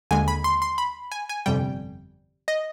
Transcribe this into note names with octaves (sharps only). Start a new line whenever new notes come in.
D#2 D3 G#3 G#5
B5
C6
C6
B5
G#5
G#5
G1 F2 C3 G3 G5
D#5